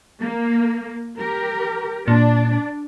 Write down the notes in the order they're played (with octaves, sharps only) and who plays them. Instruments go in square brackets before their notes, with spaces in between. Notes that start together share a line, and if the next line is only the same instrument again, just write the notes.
[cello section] A#3
G4 A#4
[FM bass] A#2 [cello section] D4